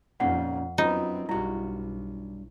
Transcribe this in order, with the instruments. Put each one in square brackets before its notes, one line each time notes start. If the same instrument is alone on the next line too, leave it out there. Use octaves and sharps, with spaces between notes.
[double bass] F2 [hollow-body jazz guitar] A#2 C#4 D#4 [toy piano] F#5
[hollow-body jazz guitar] F#2 [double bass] B3 C4 [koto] D#4 [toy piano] F4
[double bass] B1 [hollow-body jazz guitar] G2 F#4 [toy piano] E4